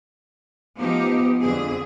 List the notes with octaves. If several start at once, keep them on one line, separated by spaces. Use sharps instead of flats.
F3 B3 D#4 G4
F2 D3 G#4